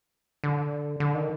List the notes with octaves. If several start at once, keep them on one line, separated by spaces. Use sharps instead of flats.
D3
D3
D#3